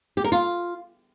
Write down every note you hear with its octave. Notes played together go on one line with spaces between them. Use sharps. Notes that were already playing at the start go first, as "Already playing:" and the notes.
G4
A#4
F4